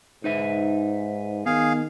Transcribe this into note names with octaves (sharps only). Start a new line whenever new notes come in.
G#2 D#4 B4 E5
D#3 B3 G#4 F5